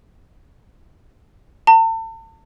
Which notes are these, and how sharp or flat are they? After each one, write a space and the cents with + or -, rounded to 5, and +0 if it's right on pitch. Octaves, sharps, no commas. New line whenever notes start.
A5 +40